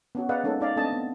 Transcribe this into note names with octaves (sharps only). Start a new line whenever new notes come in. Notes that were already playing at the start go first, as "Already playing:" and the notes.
B3 C#4 F#4
G#4 B4 D5 D#5 F5 F#5
G#3 A#3 C#4 D#4 A4
D#4 D5 F5
A3 C4 D4 A4 D#5 A5
B3